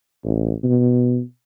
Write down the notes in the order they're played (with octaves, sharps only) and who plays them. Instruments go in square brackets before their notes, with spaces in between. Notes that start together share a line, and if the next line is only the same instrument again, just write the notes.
[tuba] A1
B2